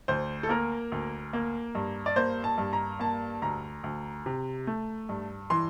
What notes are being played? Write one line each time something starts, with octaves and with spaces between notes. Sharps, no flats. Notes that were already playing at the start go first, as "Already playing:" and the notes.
D2 C5
A4
A#3 A#4
D2
A#3
G2
D5
A#3 C5
A5
G2
A#5
A#3 A5
D2 A#5
D2
C3
A3
G2
E3 C6